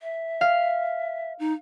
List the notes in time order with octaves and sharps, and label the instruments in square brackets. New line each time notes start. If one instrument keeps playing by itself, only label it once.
[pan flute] E5
[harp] F5
[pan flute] D#4